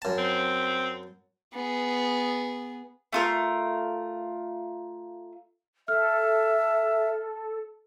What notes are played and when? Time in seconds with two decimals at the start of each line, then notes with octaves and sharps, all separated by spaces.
0.02 F#2 A5
0.18 C4
1.53 B3 G#4
3.13 A3 F4 A#4
5.88 A4 E5 F6